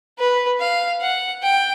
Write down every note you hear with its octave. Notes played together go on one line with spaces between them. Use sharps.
B4
F5
F#5
G5